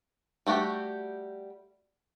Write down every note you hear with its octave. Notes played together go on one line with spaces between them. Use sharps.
G3 A3 F#4 G4